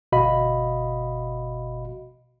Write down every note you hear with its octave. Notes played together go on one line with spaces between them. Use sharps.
G1 B2 F#4 D#5 F5 B5